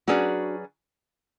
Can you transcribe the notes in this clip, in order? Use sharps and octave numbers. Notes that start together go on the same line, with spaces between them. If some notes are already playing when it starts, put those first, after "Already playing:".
F#3 C#4 D4 F#4 G#4 B4 D5